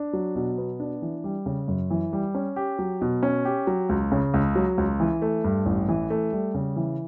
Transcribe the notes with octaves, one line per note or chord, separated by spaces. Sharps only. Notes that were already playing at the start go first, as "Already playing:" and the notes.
Already playing: D4
F#3
B2
B3
D4
E3
G3
C#3
F#2
E3
G3
C#4
G4
F#3
B2
C#4
G4
F#3
C#2
C#3
C#2
F#3
C#2
E3
A3
G2
A1
E3
A3
G3
C#3
E3